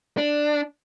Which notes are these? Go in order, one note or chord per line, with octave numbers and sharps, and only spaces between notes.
D4